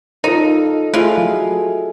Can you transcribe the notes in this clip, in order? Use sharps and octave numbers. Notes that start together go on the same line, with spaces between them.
D#4 F4 A4 A#4
D#5
A3 E4 F4 G#4 A4
F#3